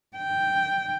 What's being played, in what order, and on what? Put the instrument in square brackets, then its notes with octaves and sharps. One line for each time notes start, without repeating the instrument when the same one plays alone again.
[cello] G5